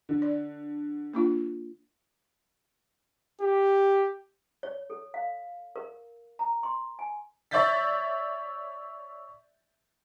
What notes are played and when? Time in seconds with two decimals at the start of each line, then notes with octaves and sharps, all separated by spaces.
0.09 D3
0.22 D5
1.14 A#3 D4 F4
3.41 G4
4.63 C#5
4.90 A4
5.14 F5
5.76 A#4
6.39 A#5
6.63 C6
6.99 G#5
7.51 C#5 D5 E5 G6 A6 B6